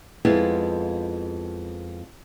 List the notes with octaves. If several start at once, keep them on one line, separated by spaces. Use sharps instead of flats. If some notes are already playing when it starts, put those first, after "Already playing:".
F2 G#3 B3 E4 F4